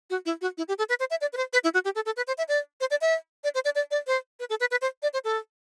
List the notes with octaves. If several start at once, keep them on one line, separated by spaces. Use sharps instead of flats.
F#4
E4
F#4
E4
G4
A4
B4
C5
E5
D5
B4
C5
B4
E4
F#4
G4
A4
A4
B4
C5
E5
D5
C5
D5
E5
D5
C5
D5
D5
D5
C5
B4
A4
B4
B4
C5
D5
C5
A4